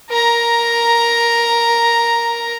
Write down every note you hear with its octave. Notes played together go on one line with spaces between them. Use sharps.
A#4 A#5